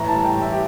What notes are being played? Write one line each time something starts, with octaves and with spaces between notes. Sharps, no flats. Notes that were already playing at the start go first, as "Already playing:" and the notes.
Already playing: A2 E3 A#5
A5
G3
G5
A2
E5
G4